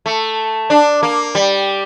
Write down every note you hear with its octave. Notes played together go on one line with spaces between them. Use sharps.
A3
D4
A#3
G3